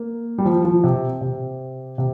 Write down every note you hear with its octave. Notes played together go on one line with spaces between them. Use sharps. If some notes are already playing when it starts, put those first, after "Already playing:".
Already playing: A#3
G3
F3
F3
C3
C3
C3